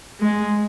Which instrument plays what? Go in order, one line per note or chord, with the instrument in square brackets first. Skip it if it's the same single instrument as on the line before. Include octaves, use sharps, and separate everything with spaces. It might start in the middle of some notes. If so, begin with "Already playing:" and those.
[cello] G#3